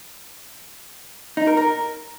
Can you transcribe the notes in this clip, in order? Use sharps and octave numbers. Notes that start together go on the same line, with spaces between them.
D#4
A#4
A#4